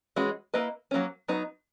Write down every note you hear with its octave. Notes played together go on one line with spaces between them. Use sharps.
E3 G#3 C#4 F#4
A#3 E4 B4 D#5
F#3 A#3 C#4
F#3 B3 D#4